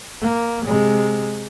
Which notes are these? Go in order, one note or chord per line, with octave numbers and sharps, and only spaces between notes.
A#3
C3 G#3